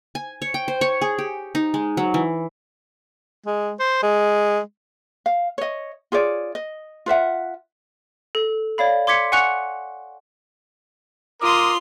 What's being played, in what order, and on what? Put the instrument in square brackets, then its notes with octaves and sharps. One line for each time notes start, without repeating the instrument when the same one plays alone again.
[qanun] G#5
C#5
G5
C5
C#5
G#4
G4
D#4
G#3
F#3
E3
[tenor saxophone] G#3
C5
G#3
[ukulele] F5
C#5 D#5
F4 G#4 C#5 D5
D#5
F4 B4 E5 F#5
[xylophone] A4
C#5 D5 F5 B5
C6 D6 G#6 B6 C#7
F#5 G#5 C#6 F#6 C#7 F7
[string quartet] F4 C6 [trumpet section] A#4 D6 D#6